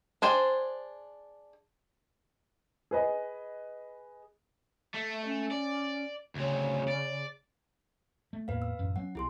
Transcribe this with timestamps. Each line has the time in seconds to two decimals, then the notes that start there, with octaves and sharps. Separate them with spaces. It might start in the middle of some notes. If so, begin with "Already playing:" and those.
0.22 D4 G#4 C5 G5
2.91 G#4 B4 D#5
4.95 A3 E5
5.24 C#4
5.52 D5
6.35 D2 C#3 C4
6.88 D5
8.33 A3
8.48 E2 A2 A#3 B4 F5
8.62 E6
8.79 A1 F#2
8.96 F#3 A#3 C#4 F#5
9.15 B1 E4 G#4 C6